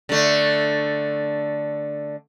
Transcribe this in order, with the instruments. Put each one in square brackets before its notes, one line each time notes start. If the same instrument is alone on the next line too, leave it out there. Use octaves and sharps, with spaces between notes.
[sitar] D3 A3